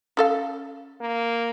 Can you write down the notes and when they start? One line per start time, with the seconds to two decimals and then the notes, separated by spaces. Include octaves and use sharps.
0.17 C#4 A4 F5
1.01 A#3